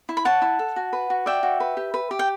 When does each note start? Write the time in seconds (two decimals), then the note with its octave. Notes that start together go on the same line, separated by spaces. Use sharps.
0.09 E4
0.17 B5
0.25 C#5 F#5 A5
0.42 E4
0.59 A4
0.76 F#4
0.93 B4
1.10 F#4
1.26 D5 E5 G5
1.43 F#4
1.60 B4
1.77 G4
1.94 B4
2.11 G4
2.19 G5